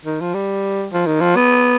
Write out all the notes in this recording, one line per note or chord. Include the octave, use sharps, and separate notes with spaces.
D#3
F3
G3
F3
D#3
F3
B3